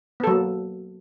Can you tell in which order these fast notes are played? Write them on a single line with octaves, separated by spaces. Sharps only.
B3 A4 F#3 A#3